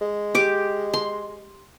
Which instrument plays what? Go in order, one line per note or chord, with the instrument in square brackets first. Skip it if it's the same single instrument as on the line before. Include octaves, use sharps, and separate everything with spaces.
[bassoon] G#3
[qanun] G4 D6
C6